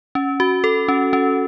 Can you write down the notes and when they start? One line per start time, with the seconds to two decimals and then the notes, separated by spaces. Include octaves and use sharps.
0.15 C#4
0.40 F#4
0.64 A4
0.88 C#4
1.13 C#4